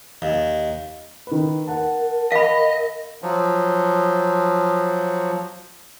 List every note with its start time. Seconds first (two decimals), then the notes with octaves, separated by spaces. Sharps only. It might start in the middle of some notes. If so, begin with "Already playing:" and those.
0.22 D#2
1.27 D#3 B4
1.68 A#4 F#5 A5
2.32 D#5 F5 B5
3.22 F3 F#3